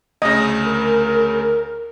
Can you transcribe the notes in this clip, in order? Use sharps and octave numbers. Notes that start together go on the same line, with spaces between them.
D2 C#3 D#5
A#4